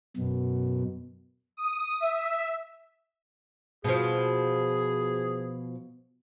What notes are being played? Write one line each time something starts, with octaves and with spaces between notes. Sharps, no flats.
F#2 B2
D#6
E5
B2 F3 G#4